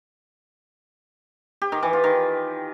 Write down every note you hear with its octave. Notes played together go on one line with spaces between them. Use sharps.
G4
D#3
E3
F4
D#3